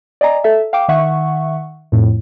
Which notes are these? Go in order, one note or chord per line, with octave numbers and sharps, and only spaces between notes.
D5 D#5 G#5 A#5
A4 E5
F5 G5 D6
D#3 E5 F#5 C#6
F2 A2